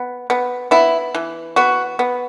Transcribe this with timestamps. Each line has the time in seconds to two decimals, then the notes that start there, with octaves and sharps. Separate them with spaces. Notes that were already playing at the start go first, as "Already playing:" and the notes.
Already playing: B3
0.30 B3
0.71 B3 E4
1.15 E3
1.56 B3 F#4
1.99 B3